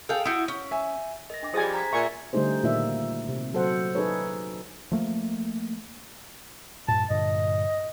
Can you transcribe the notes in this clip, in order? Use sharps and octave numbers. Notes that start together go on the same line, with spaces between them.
G#4 A4 F5 G5
E4 F#4 D#6 G6
C#4
E5 G#5
A#4 D#5 A#6
D4 G5 D6
F3 G3 G#4 C5 D#5 G#5 D#6 A6
A#5 G#6 B6
A#2 E5 F#5 G#5 C#6
D3 G3 A3 D#4 G#4 C5
A#2 D#3 A#3 D#4 D5 E5
C3
F#3 A4 C5 F#5
D#4 G#4 A4 B4 C#5
F3 A3 A#3
G2 A#2 A5
G2 A#2 D3 D#5